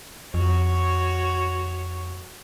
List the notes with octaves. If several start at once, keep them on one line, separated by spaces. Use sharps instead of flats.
F2 F#4 C#5